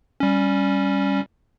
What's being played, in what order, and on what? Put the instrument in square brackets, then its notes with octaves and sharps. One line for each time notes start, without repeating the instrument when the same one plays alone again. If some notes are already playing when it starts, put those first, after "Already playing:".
[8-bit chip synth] G3 C#4